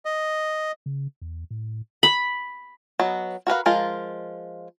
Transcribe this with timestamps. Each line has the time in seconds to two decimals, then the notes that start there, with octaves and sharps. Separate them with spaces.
0.05 D#5
0.86 C#3
1.22 E2
1.51 A2
2.03 B5
3.00 F#3 B3 D#5
3.47 F#4 A#4 B4 F5
3.66 F3 G#3 F4 A#4